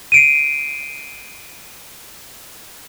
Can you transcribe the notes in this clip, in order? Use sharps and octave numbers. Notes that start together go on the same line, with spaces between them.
C7 D7 D#7